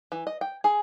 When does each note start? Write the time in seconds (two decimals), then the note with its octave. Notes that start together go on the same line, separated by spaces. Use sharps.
0.12 E3
0.27 D#5
0.41 G5
0.64 G#4